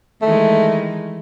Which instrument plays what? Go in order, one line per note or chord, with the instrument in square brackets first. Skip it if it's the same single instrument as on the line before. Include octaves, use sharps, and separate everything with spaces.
[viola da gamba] D#3 E3 G#3 [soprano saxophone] A3